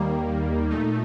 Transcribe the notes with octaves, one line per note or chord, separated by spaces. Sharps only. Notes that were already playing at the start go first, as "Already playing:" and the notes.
Already playing: D#2 D#3 G3 A#3
A#2 A3 D#4